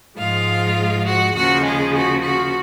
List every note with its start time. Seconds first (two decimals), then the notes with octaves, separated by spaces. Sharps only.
0.18 G#2 F3 G#3 F4 F5
1.06 F#4 F#5
1.36 D#2 C#3 F3 F#4 F#5
1.65 G#3 G#4
1.95 F#4
2.23 F#4